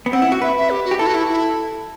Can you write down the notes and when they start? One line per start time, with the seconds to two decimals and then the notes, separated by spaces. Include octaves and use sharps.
0.06 B3
0.13 C4 F#5
0.22 E4
0.32 F#4
0.42 B4 E5
0.57 E5
0.70 G4
0.85 F#4
0.91 G4
0.99 E4 A4
1.07 F#4
1.14 E4
1.28 E4